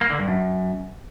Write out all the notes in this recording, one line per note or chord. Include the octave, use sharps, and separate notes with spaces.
A#3
D3
G2
F#2